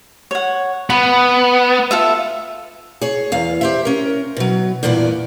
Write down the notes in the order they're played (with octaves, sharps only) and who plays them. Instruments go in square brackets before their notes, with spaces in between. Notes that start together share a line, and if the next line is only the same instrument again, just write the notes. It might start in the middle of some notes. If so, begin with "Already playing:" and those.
[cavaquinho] C#5 F#5
[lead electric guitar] B3 [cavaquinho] B5
[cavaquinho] F4 A4 E5
[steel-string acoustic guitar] G#4 C#5
E2 F5
G4 C5 E5
C#4 A#4
B2 F#3
E2 G2 A#2 B3 D5